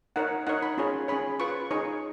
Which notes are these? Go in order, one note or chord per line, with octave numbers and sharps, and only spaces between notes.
D#4 A#4 C#5 F#5
D#4 A#4 C#5 F#5
B5
C#4 F4 G#4 C#5
C#4 G#4 C#5 B5
F4 B4 C#6
D#4 G#4 C#5 C#6